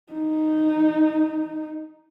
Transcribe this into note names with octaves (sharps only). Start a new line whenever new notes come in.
D#4